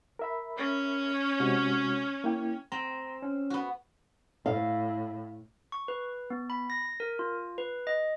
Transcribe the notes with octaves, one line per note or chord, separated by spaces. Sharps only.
A#4 E5 B5
C#4 C#5
C3 G#3 F#4
A#3 E4 G5
C4 A#5
C#4
B3 F#4
A2 F5
C#6
B4
B3
B5
A#6
A#4
F4
B4
D#5